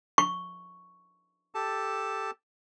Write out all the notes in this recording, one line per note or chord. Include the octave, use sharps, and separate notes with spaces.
C#6
G4 A4 A5